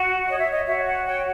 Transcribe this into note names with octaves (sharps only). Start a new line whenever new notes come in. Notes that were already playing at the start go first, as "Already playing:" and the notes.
Already playing: F#4
C#5 D#5
E5
D#5
F#4 E5
F#5
C#5 G5